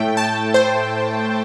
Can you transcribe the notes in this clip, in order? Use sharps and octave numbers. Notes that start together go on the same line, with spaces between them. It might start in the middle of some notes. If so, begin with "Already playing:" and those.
Already playing: A2 A3 G5
A5
C5